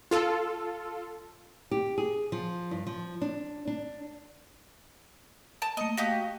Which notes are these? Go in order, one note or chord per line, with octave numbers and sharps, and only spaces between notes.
F4 A4
G4
G#4
F3
G2
F3
D4
D4
A5
A3 A#3 D#5
F#4 G4 D#5 F5